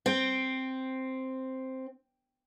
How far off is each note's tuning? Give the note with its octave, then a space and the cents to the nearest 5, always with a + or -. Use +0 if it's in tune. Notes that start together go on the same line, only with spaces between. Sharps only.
C4 +0 G5 +0